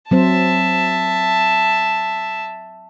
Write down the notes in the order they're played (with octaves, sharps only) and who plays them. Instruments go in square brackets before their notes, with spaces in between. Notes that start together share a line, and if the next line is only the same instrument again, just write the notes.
[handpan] F#3 C4 C5 [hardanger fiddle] E5 A5